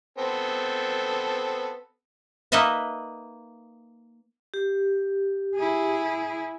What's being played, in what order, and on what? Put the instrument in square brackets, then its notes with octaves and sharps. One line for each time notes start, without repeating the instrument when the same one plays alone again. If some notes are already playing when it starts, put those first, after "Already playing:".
[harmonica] B3 C4 A4
[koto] A#3 D#4 B4 D#5 E5 F#5
[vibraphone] G4
[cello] E4 G#4